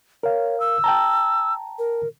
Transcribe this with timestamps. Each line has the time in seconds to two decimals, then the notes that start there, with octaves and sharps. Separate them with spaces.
0.23 A#4 C#5 F5
0.60 E6
0.84 G5 A5 A#5
1.79 A#4